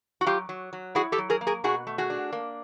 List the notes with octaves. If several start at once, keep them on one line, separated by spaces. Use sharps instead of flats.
F#4
F#3 F4 G4
F#3
F#3
E4 F#4 G#4
G4 A4
F#3
G#4 A#4
A#3
G#4 A#4
B2 F#4 G#4
A3
F#4 G#4
D4
A#3